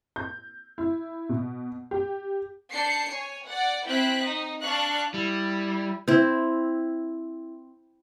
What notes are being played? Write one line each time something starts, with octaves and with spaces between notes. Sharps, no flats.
G6
E4
B2
G4
D4 G6 C7 C#7
C#5 G#5
D5 F#5
C4 E4 G5 F#6 B6
D#4 D#5
D4 F5 C#6 F#6
G3 E4
C4 E4